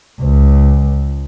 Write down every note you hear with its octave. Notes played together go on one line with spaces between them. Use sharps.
C#2